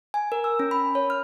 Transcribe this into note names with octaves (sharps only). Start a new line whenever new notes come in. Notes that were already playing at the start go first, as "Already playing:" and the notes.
G#5
A#4
E6
C#4
B5
C#5
F6